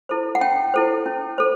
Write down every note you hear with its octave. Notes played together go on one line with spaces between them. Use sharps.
E4 A4 C5
F#5
C#4 G5
E4 A4 C5
C#4
A4 C5